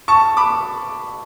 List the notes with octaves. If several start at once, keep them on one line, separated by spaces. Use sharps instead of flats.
A5 C#6
B5 D6